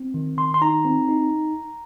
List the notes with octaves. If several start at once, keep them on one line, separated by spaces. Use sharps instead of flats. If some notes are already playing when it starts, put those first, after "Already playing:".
Already playing: C4
D#3
D#3 C6
C6
D#4 A#5
C4
D#4